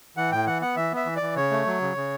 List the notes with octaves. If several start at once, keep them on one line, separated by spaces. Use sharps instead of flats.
E3 F#5
A2 G5
E3 F#5
B3 F#5
E3 E5
B3 E5
E3
E3 D5
C#3 C#5
A3
F#3
C#3
C#3